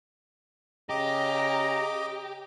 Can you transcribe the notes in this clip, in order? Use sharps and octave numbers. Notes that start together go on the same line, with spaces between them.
C#3 G4 D#5 A#5 D6